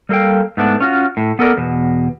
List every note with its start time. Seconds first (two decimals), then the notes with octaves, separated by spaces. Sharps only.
0.09 G3 A#3 A4 F5 G5
0.57 G#2 A3 B3 D4
0.80 C#4 F4 F#4
1.17 A2
1.39 B3 A4 A#4 D5
1.57 E2 B2